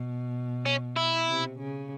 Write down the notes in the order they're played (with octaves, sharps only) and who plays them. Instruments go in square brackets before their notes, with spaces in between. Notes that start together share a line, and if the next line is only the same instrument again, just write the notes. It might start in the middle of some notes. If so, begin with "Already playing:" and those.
Already playing: [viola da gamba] B2
[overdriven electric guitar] C#4
E4
[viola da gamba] C3
C#3